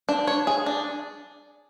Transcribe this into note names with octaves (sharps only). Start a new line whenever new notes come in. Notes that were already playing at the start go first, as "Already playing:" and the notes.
D4
C#5
G#4
D4